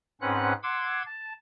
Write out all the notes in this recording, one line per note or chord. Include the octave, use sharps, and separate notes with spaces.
G#2 C4 C#4 B4 F#5 F#6
F#5 C6 D6 E6 G#6
A5